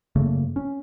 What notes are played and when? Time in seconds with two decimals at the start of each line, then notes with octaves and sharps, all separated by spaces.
0.15 F#2 C#3 A3 A#3
0.56 C#4